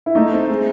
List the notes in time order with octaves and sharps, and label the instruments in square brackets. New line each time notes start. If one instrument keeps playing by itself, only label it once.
[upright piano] E4
[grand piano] A3 [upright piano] D#4
[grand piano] C4
G#3